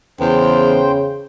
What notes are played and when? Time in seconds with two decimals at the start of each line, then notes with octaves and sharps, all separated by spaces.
0.20 E2 C#3 C5 G5